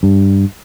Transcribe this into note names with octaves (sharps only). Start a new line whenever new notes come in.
G2